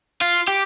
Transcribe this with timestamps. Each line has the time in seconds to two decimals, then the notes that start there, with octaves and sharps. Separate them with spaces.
0.21 F4
0.48 G4